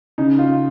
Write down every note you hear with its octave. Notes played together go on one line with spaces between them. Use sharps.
C#3 D#4
F4